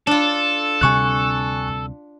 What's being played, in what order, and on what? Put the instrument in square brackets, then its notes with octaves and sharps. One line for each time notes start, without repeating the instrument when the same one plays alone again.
[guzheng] D4 F4 [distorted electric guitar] A4
[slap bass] D2 C3 G3 [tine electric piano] G#5 C#6 F#6